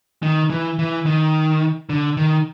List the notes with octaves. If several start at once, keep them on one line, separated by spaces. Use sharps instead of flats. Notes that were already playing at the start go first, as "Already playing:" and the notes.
D#3
E3
E3
D#3
D3
D#3